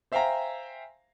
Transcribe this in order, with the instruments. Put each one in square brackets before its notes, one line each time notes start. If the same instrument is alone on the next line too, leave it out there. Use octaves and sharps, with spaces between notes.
[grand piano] C5 E5 F5 G5 G#5 A#5